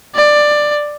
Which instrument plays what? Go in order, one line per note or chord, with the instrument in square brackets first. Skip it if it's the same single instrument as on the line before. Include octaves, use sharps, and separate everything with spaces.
[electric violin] D5